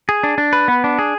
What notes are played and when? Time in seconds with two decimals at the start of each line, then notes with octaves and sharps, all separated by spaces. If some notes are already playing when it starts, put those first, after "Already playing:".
0.09 G#4
0.23 D4
0.38 D4
0.53 B4
0.68 B3
0.84 D4
0.99 G#4